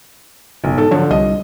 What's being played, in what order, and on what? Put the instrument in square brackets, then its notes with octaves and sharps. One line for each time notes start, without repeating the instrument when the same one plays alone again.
[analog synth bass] F#1 [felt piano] B1
[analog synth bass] G#2 [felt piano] A4
[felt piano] D3 F3 [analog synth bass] F#3
[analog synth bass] C2 [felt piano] D#5